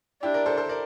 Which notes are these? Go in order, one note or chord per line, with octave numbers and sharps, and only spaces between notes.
D4 E4 G4
A#4 D5
A4 C5
A4 C5
A#4 D5